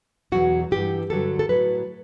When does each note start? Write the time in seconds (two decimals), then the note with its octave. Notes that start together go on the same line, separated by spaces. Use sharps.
0.32 E2 B2 F#3 F#4
0.71 G2 E3 G4
1.10 G2 D3 F#3 A4
1.39 A4
1.49 A2 F#3 B4